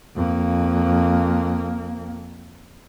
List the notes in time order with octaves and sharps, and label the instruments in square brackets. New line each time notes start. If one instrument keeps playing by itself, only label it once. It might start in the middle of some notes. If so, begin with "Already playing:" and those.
[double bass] F2 A#3